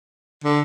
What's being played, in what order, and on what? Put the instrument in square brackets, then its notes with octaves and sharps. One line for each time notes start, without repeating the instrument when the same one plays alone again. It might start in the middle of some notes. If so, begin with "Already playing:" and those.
[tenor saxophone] D3